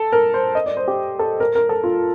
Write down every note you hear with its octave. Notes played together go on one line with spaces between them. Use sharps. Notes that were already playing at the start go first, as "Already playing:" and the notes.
Already playing: A4
A#4
C5
D#5
D5
C5
G4
A4
A#4
A#4
A4
F4